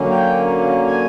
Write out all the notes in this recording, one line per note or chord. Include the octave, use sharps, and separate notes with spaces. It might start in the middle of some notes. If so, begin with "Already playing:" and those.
Already playing: D3 F#3 A#3 C#4
G5
G#5